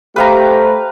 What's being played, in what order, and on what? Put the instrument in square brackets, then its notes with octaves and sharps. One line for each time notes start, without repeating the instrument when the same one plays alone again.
[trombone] A3 [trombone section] G4 [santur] B4 F5 A#5 [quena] C5